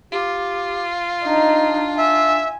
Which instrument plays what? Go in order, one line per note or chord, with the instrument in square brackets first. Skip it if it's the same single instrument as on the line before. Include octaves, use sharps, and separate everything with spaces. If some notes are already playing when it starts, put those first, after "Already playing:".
[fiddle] F4 [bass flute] G4
[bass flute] D4 [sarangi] D#4
[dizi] E5 [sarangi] G#5